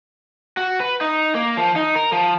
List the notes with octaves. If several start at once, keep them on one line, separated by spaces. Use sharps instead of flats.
F#4
B4
D#4
A#3
F3
D#4
A#4
F3